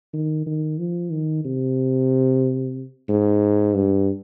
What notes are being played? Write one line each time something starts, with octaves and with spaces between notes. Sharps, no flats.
D#3
D#3
F3
D#3
C3
G#2
G2